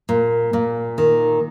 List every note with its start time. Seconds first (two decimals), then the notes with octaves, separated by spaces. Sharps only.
0.09 A#2
0.53 A#2
0.98 D#3